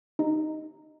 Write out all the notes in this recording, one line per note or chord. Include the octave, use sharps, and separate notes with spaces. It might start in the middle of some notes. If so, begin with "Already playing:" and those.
D#4 G4 D#5